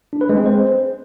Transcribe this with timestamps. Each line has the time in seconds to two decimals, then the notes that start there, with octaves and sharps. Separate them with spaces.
0.13 D4
0.21 B4
0.29 G#3
0.38 C4
0.46 C5